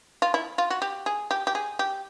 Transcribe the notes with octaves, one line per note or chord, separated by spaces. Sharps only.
F4
E4
F4
F#4
G4
G#4
G4
G4
G#4
G4